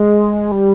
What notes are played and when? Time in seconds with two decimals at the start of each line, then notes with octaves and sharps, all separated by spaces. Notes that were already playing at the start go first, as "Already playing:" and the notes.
Already playing: G#3
0.52 G3